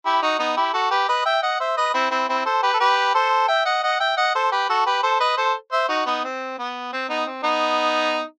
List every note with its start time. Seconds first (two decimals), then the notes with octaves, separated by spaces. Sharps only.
0.05 E4 G4
0.22 D#4 F#4
0.39 B3 D#4
0.56 E4 G4
0.74 F#4 A4
0.91 G4 B4
1.08 B4 D#5
1.25 E5 G5
1.42 D#5 F#5
1.60 C5 E5
1.77 B4 D#5
1.94 C4 E4
2.11 C4 E4
2.29 C4 E4
2.45 A4 C5
2.63 G4 B4
2.74 A4
2.80 G4 B4
3.14 A4 C5
3.48 E5 G5
3.65 D#5 F#5
3.83 D#5 F#5
4.00 E5 G5
4.17 D#5 F#5
4.35 A4 C5
4.52 G4 B4
4.69 F#4 A4
4.86 G4 B4
5.03 A4 C5
5.20 B4 D#5
5.37 A4 C5
5.72 C5 E5
5.89 D#4 F#4
6.06 B3 D#4
6.24 C4
6.58 B3
6.92 C4
7.09 B3 D#4
7.26 C4
7.43 B3 D#4